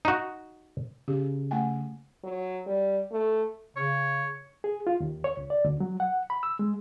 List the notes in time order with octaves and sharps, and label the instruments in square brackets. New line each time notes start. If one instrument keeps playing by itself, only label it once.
[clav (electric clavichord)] D#4 F#4
[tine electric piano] C#3 [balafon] G4
[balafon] A3 G5 G#5
[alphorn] F#3
G3
A3
[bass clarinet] C#3 [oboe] C#5
[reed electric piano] G#4
F4
D#2
C#5
C#2
D5
D2
F#3
F#5
B5
E6
G#3